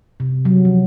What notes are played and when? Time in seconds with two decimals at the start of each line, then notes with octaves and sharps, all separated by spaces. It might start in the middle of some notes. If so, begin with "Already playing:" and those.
0.20 C3
0.45 F#3
0.65 F3